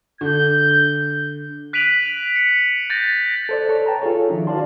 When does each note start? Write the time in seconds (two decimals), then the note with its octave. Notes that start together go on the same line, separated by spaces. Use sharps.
0.21 D3 G6
1.73 F#6 B6 D7 D#7 F7 F#7
2.36 C#7
2.90 G6 A6 A#6
3.49 A4 C5 D5
3.69 A4 C#5
3.86 B4 G5 A5 A#5
4.02 F4 G#4 A4 C#5
4.28 D#3 F3 D4 E4
4.47 F#4 B4 D5 F5 A5 C6